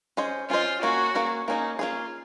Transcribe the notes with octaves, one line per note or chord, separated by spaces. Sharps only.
C#4 G#4 C5 D#5
C#4 F4 G#4 C5 D#5
A#3 C#4 F#4 G#4
A#3 C#4 G#4
A#3 C#4 D#4 G#4
A#3 C#4 F4 G#4